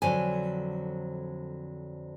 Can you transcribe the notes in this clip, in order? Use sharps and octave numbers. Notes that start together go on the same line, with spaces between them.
F2 D3 F#3 G#5